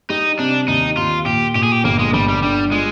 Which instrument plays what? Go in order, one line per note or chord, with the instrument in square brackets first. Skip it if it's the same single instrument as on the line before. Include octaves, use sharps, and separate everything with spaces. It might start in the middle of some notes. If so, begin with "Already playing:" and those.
[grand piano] G3 [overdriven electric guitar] D#4
[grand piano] C3 [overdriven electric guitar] D4
[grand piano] D#2 [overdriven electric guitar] D#4
[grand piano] D#2 [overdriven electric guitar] F4
[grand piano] A#2 [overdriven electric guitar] G4
[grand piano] A#2 [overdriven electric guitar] G4
[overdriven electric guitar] G#4
G4
[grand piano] G1 [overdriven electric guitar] A#3
[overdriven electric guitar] G#3
[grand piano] G1 [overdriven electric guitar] G3
[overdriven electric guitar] G3
[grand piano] D3 [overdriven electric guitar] G3
[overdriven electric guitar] G#3 [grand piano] F4